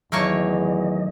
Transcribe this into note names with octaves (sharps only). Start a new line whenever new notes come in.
E2 D#3 F#3 A3 A#3 C#5 D#5